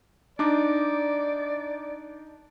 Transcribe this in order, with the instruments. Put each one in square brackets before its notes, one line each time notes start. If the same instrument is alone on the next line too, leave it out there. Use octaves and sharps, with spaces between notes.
[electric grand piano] D4 D#4 D6 [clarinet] D5